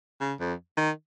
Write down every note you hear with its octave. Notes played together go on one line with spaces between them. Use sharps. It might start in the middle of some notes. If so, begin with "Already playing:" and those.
C#3
F2
D#3